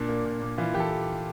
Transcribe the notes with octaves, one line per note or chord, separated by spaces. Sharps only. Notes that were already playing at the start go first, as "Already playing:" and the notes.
Already playing: A#2 D4
A#3
A#2
A#2
E3 F4
E3 G4
A4